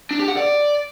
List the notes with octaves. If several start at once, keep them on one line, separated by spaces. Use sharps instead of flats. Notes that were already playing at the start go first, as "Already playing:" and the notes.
D4
G4
F#5
D5